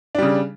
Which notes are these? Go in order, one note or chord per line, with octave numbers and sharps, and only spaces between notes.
C#3 G3 D4